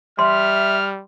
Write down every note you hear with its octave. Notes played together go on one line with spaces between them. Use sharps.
G3 E5 C6 F6